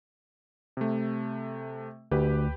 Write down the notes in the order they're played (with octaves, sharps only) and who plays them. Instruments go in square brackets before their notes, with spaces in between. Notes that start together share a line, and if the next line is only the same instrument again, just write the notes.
[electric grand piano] C3 A3
[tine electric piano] D2 [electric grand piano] G4 B4